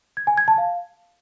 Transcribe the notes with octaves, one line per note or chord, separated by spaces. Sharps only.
G#6
G#5
G#6
A5
F5